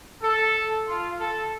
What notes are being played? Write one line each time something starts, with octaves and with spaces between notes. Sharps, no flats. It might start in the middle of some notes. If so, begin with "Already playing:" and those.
A4
F4
A4